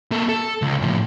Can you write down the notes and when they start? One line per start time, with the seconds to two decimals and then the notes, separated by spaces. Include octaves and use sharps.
0.11 A#3 A4
0.29 A4
0.62 C#2
0.82 A2 F3